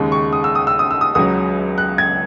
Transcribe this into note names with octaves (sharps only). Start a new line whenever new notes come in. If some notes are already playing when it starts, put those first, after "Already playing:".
Already playing: D#2 C#3 G#3
C#6
D#6
E6
D#6
E6
D#6
E6
D#6
C#2 C#3 F#3 D#6
F#6
G#6